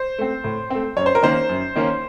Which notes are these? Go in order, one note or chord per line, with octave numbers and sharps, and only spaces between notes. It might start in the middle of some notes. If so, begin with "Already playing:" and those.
Already playing: C5
A3 C4
A2
A3 C4
F#2 C#5
C5
A#4
D#3 A#3 C#4 C5
F#2
D#3 A#3 C#4